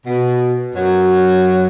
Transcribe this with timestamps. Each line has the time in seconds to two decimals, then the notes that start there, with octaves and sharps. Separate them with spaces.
0.06 B2
0.76 F#2 F#3